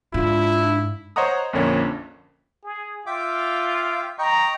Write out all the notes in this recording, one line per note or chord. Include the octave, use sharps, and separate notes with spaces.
G#2 D4 E4 F4
C5 C#5 D#5 F#5 A#5 D#6
A#1 F2 D3 A#3 C#4 C#5
G#4
F4 E5 G5 D6
D#5 G5 A#5 C#6